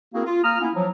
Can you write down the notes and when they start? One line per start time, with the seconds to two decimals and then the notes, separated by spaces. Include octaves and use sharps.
0.14 A#3 C4 E4 F#4 G#4 A#4
0.26 F4
0.44 A#3 A#5 D#6 F6
0.61 A#3 B3 C#4 E4
0.75 F3 F#3